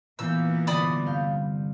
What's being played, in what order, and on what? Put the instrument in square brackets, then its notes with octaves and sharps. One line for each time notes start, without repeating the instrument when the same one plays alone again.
[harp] A#2 F5 G6 [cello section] E3 A#3 B3 [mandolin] E6
[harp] C2 D3 [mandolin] D5 B5 D#6
[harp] G2 F5 G6